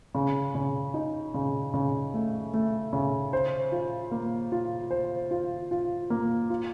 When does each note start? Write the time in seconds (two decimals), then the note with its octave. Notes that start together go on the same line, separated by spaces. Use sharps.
0.14 C#3
0.55 C#3
0.94 D#4
1.34 C#3
1.74 C#3
2.14 A3
2.53 A3
2.93 C#3
3.33 C5
3.72 F4
4.11 A#3
4.52 F4
4.91 C5
5.31 F4
5.71 F4
6.10 A#3
6.50 F4